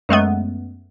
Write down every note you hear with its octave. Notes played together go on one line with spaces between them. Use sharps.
F#2 G#3 A3 B3